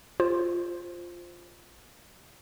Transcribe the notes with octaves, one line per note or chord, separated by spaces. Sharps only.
F4 C5